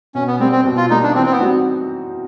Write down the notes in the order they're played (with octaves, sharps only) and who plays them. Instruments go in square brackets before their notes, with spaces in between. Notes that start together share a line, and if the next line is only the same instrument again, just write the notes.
[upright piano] B2 [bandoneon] C#4
[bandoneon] B3
[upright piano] G3 A#3 [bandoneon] C4
[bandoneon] C4
[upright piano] B2
[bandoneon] F4
[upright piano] G3 A#3 [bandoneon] D#4
[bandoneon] D4
[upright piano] E3 [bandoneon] C4
[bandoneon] C4
B3
[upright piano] G3 C4 D#4 F#4